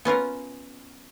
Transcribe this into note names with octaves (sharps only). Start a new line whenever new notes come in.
B3 C#4 F4 A#4